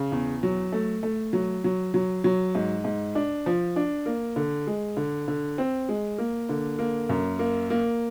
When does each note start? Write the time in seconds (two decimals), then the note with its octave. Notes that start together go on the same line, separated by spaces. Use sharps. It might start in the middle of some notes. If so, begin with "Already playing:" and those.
Already playing: C#3
0.12 E2
0.43 F#3
0.72 A3
1.03 A3
1.33 F#3
1.64 F#3
1.94 F#3
2.24 F#3
2.55 G#2
2.84 G#2
3.15 D4
3.46 F3
3.76 D4
4.06 A#3
4.36 D3
4.67 G#3
4.97 D3
5.28 D3
5.58 C4
5.89 G#3
6.18 A#3
6.49 D3
6.79 A#3
7.09 F#2
7.39 A#3
7.70 A#3